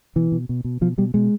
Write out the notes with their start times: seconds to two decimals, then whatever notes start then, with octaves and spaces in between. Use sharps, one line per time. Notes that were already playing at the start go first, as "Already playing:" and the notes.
0.16 B2 E3
0.32 B2
0.49 B2
0.64 B2
0.81 B2 F3
0.98 B2 G3
1.14 B2 G#3